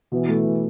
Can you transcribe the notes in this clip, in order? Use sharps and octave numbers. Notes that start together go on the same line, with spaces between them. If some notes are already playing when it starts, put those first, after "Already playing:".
B2 E3
A3
B2